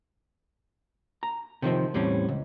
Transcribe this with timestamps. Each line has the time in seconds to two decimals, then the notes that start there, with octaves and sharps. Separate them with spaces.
1.23 A#5
1.62 C3 D#3 F3 C4
1.94 E2 A2 G3 C4 C#4
2.28 C#2